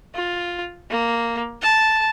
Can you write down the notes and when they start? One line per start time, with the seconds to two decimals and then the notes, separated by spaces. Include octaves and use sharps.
0.15 F4
0.91 A#3
1.62 A5